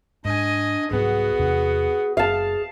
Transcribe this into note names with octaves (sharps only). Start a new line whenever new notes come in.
G#2 D4 D#5 G#5
C2 G#2 F#3 B3 F#4 G#4
E2 C3 D4
F#1 G#4 F5 A5